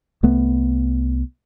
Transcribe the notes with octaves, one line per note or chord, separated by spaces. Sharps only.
C2 A3 B3